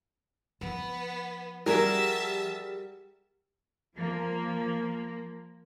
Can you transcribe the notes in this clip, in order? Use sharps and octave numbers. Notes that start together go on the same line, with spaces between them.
F3 B3
G3 F#4 G#4 A#4 E5 A5
F3 A#3